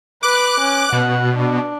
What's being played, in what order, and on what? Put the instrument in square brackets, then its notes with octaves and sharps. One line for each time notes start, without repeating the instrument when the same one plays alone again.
[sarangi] B4 [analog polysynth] D6 F#6
[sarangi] C#4
[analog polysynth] B2 [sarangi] F#5
[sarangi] D4